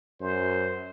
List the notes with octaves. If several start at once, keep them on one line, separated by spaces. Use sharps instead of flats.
F#2 C5